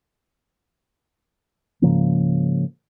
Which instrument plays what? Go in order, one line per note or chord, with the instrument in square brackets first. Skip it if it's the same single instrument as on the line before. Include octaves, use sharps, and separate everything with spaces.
[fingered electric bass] G#2 C#3 F3 A#3